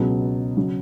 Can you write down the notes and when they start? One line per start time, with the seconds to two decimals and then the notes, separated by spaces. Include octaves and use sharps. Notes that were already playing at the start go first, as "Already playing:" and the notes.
Already playing: C#2 B2 F#3
0.57 C#3 F#3